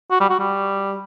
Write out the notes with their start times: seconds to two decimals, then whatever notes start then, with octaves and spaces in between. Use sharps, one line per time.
0.11 F#4
0.20 G3
0.30 F#4
0.39 G3